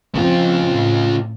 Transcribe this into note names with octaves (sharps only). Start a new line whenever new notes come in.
C#3 F3 C4 F4
A2